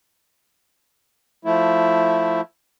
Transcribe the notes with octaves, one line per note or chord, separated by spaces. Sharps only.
F3 A3 E4